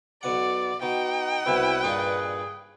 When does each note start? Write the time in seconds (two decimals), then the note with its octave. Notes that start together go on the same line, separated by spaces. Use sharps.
0.23 B1 B2 D5 F#5
0.82 B2 D#4 G5
1.46 C2 B2 E4 B4
1.84 G2 A#2 D#4 G#4